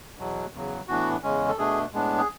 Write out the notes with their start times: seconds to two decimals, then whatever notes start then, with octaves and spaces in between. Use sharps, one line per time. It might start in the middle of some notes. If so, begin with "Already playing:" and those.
0.18 E2 B2 F#3
0.53 E2 C#3 F#3
0.88 A2 E3 B3 D4 F#4
1.23 E2 C#3 G#3 C#4
1.48 A4
1.58 B2 A3 D4 G#4
1.93 A2 G#3 B3 D4
2.17 G#4